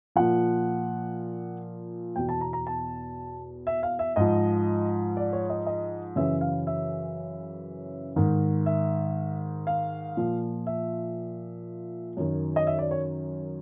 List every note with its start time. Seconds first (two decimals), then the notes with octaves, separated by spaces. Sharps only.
0.16 A#2 F3 F#5
2.16 E2 B2 G5
2.29 A5
2.41 A#5
2.53 A#5
2.67 A5
3.67 E5
3.83 F5
3.99 E5
4.16 G#2 F3 D#5
5.17 D5
5.33 C#5
5.50 D#5
5.67 D#5
6.16 F#2 C#3 E3 E5
6.41 F5
6.67 E5
8.16 G#2 D#3
8.66 E5
9.67 F5
10.17 A#2 F3
10.67 E5
12.17 F#2 D#3
12.56 D#5
12.67 E5
12.79 D5
12.91 C#5